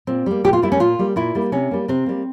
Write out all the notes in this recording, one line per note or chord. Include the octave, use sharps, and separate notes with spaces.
A#2 C4
G3 A#3
A#2 G4
F4
G3 A#3 E4
C#4
A#2 F4
G3 A#3
A#2 E4
G3 A#3
C3 C#4
G3 A#3
C3 C4
G3 A#3